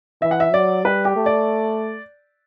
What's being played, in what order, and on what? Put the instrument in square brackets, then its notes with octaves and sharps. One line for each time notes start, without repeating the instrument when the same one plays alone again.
[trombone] E3 [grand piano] E5
[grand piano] F#5
E5
[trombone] F#3 [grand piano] D5
[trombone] G3 [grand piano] B4
[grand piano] G4
[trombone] A3
[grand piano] D5